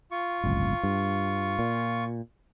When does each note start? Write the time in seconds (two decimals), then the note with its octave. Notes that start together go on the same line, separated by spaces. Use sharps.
0.11 F4 C#6
0.44 D1 G1 C#2
0.83 G2
1.59 A#2